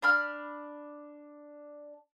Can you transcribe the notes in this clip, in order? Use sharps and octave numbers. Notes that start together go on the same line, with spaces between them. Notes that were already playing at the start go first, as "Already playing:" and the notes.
D4 B5 F6